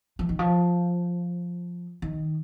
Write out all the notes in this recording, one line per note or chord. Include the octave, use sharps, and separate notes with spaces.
F3
D#3
F3
D#3